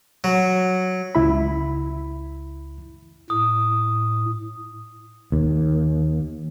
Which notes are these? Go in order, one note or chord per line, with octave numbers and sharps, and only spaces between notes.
F#3
C#2 E4 B5
A2 D#6
D#2